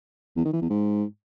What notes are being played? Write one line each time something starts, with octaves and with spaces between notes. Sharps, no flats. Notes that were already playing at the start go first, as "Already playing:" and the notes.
E2
D#3
E3
E2
G#2